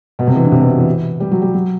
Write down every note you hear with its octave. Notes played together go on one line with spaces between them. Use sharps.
B2
C3
E3
D3
C3
B2
D3
E3
G3
F#3
G3
F#3